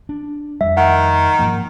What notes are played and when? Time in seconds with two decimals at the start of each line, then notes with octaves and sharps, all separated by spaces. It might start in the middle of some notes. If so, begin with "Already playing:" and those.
0.09 D4
0.61 F2 G3 E5
0.77 D#3 F#5
1.39 G#2 F3 A#3